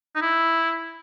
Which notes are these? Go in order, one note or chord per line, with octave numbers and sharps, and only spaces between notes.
D#4
E4